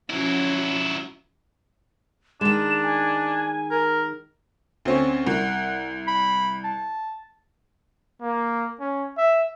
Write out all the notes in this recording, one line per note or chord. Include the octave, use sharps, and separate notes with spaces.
F3 F#3 C#4 E4 F#4
D#3 G#3 D4 E7
G#5
A#4
D2 C4 C#4
C2 F#5
B5
A5
A#3
C#4
E5